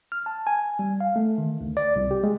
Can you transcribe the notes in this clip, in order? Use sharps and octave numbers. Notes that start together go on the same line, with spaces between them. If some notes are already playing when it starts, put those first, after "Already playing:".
F6
A5
G#5
G3
F5
A3
D#3
D2
D5
C2
G4
G#3